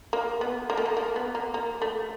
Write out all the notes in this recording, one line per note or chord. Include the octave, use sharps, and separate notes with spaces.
A#3
B3
A#3
A3
A#3
A#3
B3
A#3
A#3
A3